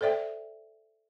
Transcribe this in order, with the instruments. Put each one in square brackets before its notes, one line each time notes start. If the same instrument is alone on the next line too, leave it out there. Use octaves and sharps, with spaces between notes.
[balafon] A4 C5 D5 E5 G5